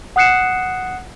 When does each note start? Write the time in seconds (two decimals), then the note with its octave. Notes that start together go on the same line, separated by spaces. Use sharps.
0.16 F#5 D#6 F#6 C7 C#7 E7